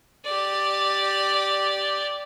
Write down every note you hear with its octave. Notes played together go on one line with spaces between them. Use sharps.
G4 D5